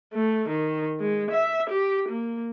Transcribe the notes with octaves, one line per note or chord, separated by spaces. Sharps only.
A3
D#3
G#3
E5
G4
A#3